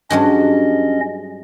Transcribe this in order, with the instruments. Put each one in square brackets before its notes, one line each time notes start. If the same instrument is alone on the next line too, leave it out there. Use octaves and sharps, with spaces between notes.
[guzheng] G2 F#3 G#3 [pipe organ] C#4 D#5